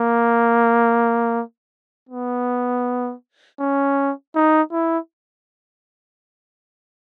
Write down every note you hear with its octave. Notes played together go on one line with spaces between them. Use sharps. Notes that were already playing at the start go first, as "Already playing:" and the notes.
Already playing: A#3
B3
C#4
D#4
E4